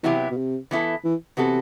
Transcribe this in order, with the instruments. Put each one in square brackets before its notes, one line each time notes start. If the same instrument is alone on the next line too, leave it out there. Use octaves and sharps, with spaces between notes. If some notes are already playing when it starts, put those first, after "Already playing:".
[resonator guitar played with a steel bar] C3 F#3 B3 E4 G4 [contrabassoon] E3
[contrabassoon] B2
C3
[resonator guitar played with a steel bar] E3 B3 E4 A4
[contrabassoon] E3
[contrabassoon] C3 [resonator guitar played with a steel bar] E3 B3 F#4 A4